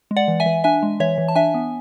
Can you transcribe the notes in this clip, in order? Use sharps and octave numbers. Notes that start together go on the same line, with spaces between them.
G#3
D5 F#5
E3
E5 G#5
E3
D4 E5 G#5
G#3
E3 C#5 E5
E3
A5
D4 E5 G#5
B3